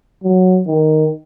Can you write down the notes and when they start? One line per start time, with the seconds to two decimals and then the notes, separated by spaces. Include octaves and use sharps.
0.23 F#3
0.67 D#3